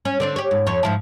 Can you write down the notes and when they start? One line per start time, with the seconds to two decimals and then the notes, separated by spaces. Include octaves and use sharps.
0.05 C#4
0.20 D3 C4 D4
0.36 G4 C#5
0.51 G#2
0.67 F2 C#5
0.83 G#2 F3 E4